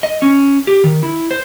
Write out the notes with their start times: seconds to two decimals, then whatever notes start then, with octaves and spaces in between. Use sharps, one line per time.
0.03 D#5
0.22 C#4
0.67 G4
0.84 D#3
1.03 E4
1.31 C5